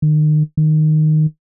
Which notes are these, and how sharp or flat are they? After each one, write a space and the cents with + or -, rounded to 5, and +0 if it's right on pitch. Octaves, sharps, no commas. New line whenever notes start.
D#3 -35
D#3 -10